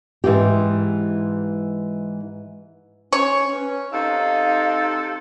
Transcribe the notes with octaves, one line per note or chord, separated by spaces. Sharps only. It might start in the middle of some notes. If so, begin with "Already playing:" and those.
G#2 E3 C4 G4
C#4 C#5
C#4 B4
C3 D#4 A4 F5